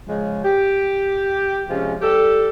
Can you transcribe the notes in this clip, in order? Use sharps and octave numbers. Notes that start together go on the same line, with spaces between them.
C#3 F3 G#3
G4
C3 F3 G#3 C#4
G3 G4 A4